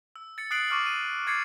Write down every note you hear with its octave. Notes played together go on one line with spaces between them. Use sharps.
E6
A6 C#7
D#6 F#6 A6 C7 D7 F#7
C#6 D6 F6 A6 F#7
D#6 D#7
D6 G#6 A6 C7 C#7